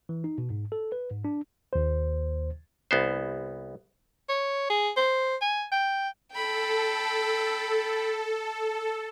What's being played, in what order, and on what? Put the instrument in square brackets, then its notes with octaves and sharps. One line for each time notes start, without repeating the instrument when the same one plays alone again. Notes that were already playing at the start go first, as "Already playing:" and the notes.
[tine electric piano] E3
D#4
B2
G#2
A4
B4
G#2
D4
[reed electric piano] D#2 C5
[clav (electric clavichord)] C2 B3 C5
[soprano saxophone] C#5
G#4
C5
G#5
G5
[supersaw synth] A4 [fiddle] G5 B5